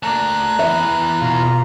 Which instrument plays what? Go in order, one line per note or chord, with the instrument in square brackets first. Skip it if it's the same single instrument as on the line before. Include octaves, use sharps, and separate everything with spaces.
[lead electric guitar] A3 D5 [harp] A#3 A5 [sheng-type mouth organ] A#5 F#6
[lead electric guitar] E3 B3 [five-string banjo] E5
[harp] B2 G#4 [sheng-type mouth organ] F4 A#5